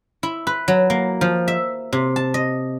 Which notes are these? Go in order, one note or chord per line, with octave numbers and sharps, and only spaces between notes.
E4
B4
F#3
A#3
F3
E5
C3
A5
D#5